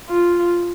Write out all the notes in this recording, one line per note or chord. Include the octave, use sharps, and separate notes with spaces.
F4